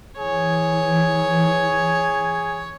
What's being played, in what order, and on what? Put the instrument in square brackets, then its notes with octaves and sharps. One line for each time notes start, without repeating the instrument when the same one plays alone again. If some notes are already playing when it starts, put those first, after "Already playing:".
[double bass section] E3 [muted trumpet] G#4 [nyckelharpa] C#5